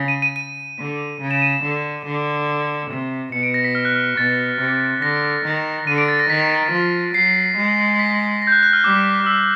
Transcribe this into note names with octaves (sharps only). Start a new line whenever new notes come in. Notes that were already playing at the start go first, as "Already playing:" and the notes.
Already playing: C#3
D#7
D#7
D#7
D3
C#3
E7
D#7
D3
D3
C3
B2 C#7
D7
A#6
B6
F6
F#6
F6
B2 A6
C3
D3 A#6
D#3
D3 D#7
D7
A6
A#6
D#3 B6
F3
F#3 C7
G#3
B6
A#6
G6
F#6
F#6
F6
G3 D6
E6